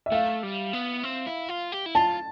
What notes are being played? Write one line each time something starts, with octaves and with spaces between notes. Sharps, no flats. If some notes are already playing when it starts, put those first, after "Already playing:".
E5
A3 F5
G3
B3
C4
E4
F4
G4
E4
F4 A5